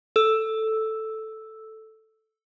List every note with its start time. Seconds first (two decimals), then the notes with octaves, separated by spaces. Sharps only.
0.16 A4 E6